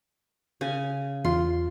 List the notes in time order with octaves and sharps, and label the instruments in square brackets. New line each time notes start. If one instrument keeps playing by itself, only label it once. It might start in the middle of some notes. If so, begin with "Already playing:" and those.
[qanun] C#3 G#5
[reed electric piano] E2 F4 [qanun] C6